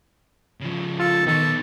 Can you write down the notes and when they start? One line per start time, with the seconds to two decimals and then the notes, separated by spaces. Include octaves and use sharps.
0.60 C#3 F3
1.00 F4 A4
1.27 D#3 B3 D#4 A4